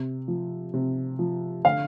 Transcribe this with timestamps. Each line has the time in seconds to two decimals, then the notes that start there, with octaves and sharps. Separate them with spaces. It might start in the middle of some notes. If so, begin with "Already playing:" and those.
Already playing: C3
0.28 F3
0.74 C3
1.19 F3
1.65 D3 F5